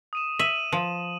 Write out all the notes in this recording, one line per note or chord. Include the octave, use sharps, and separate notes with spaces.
D#6 D#7 E7
E5 D#7 E7 F#7
F3 F#7